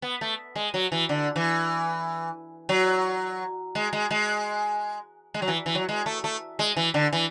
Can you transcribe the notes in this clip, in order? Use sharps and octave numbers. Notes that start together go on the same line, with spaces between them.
B3
A3
G#3
F#3
E3
D3
E3
F#3
G#3
G#3
G#3
G#3
F#3
E3
E3
F#3
G#3
A3
A3
G#3
E3
D3
E3